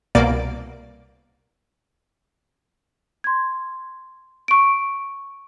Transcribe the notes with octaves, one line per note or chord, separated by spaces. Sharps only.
C2 B2 A#3 D5 D7
C6 G#6
C#6 D7